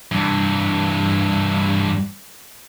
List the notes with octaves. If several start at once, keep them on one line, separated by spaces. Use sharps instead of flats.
G2 E3